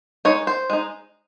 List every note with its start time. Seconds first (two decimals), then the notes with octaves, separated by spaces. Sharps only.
0.25 G#3 D#4 C#5
0.47 C5
0.70 G#3 D#4